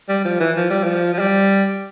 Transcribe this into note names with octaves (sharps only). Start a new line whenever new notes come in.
G3
F3
E3
F3
G3
F3
F3
G3